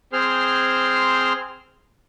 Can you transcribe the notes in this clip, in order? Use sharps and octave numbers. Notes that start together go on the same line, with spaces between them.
C4 G#4 C5 C6 F6